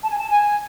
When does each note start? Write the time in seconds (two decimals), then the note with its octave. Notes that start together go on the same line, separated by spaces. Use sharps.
0.03 A5
0.10 G#5
0.18 A5
0.30 G#5